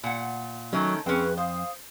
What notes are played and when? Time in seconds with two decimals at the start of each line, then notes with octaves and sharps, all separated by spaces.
0.03 A#2 F#5
0.73 D#3 F#3 A3 C#4
1.06 F2 C4 C#4 G#4 B4 F#6
1.37 C5 F5 D#6